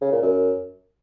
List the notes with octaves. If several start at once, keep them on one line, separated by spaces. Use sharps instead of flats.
C#3
A#2
F#2